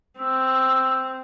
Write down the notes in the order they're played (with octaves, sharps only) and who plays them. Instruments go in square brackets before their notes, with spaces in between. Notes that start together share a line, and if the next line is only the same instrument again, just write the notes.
[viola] C4 [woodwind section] E6